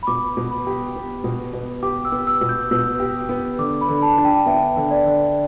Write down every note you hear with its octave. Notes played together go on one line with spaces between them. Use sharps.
B5
B2 D6
B2
B5
G4
B3
B2
B2
G4 D6
E6
B3
E6
B2
G6
B2 E6
G4
B3
D3 D6
B5
D3
A5
D4
G5
B3 E5
D3
D5
D3